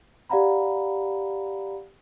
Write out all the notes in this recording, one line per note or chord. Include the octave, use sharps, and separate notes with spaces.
G4 D5 F5 F#5 A#5 B5